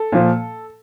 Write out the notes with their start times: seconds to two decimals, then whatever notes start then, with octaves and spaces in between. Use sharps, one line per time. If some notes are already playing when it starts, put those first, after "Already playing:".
Already playing: A4
0.12 A#2 F3